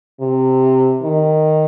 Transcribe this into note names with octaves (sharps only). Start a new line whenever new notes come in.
C3
D#3